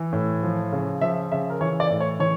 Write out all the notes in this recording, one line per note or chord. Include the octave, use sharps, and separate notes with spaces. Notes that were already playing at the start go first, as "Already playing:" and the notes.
Already playing: E3
A2
F3
C#3
F3 E5
C#3 E5
A#4
E3 C#5
D5
A2
C#5
E3 C#5